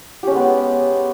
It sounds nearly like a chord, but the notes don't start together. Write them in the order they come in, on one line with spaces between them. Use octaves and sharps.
G4 C#4 G#3 B3